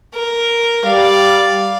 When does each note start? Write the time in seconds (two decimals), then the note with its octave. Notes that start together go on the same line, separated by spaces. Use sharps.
0.14 A#4
0.85 G3 D5 F5